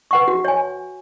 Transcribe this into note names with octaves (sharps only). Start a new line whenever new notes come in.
B4 F#5 C#6
F#4
C#5 G#5